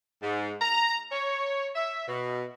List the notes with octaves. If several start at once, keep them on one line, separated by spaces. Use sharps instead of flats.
G#2
A#5
C#5
E5
B2